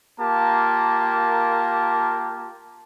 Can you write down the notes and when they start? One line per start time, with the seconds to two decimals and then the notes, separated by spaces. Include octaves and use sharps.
0.20 A#3 F4 G4 A#4 A5